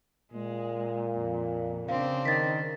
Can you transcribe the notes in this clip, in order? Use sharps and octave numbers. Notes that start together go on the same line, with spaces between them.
A#2 G#3
F2
C#3 C4 D4 F5
D#3 A6 B6